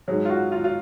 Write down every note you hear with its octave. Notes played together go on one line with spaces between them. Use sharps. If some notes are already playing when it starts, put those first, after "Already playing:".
G#2 F#3 G#4
F4
F#4
F4
F4